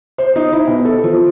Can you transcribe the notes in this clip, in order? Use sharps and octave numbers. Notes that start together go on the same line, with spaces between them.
C5
D#4
E4
B2
A4
F3